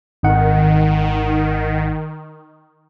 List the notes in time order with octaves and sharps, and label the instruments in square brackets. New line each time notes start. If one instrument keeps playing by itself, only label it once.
[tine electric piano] G#1 F#5 [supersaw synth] D#3